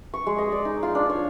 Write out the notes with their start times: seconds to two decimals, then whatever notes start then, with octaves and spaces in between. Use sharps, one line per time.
0.14 C#6
0.27 G#3
0.38 D#5
0.52 D5
0.65 D#4
0.83 F4
0.95 D4
1.09 C#5